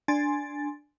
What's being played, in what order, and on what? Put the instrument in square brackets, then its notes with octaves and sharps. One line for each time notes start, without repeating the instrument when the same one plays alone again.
[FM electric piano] D4 G#5 C6 A6